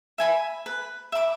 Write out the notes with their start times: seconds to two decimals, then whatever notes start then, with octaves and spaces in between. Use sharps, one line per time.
0.18 E5 G#5 B5
0.66 B4
1.12 E5 B5 D6